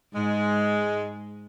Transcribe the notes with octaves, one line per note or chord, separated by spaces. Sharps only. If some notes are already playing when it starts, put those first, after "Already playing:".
G#2 G#3